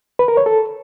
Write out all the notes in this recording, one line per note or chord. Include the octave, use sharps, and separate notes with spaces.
B4
A#4
C#5
A4